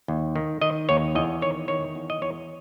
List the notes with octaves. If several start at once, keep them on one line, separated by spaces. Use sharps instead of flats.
D#2
D#3
D#3 D#5
D#2 C#5
E2 D#5
D#3 C#5
D#3 C#5
E2
D#5
E2 C#5